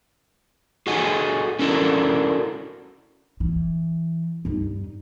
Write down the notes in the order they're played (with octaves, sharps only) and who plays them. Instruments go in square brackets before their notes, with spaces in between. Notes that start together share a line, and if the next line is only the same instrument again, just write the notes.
[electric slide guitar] F#4 G#4 A4 D#5 F#5 G#5
C#4 D4 E4 F#4 A4 A#4
[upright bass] E3
G2 D#4